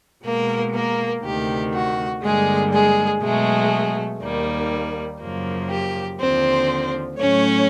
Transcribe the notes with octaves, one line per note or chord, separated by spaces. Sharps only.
B2 G#3 A#3 A#4
A#3 A#4
D2 C3 D#3 G4
F#4
G2 D3 G3 G#3 A#3 G#4
G#3 G#4
B2 F#3 G#3 A3 G#4
D#2 D#3 G3 A#3
F#2 C#3 F3 A#3
G4
D#2 D3 F3 C4 C5
A2 F#3 A3 C#4 C#5